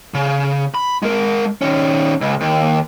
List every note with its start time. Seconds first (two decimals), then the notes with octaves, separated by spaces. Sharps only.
0.14 C#3
0.74 B5
1.02 G#3 A#4
1.62 D#3 C#4
2.21 C#2
2.41 D#2